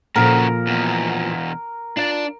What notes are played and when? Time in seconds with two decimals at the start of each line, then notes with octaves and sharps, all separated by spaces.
0.16 A#2 C#3 F3 F#4 A#4
0.67 E2 B2
1.97 D4 F4 D5